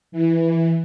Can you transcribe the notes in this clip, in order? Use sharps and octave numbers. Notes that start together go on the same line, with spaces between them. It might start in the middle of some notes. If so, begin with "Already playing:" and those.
E3